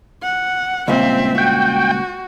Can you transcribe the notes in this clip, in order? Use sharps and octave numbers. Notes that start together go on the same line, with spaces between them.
F#5
C#2 G2 A#2 C4 E5
F#4 G5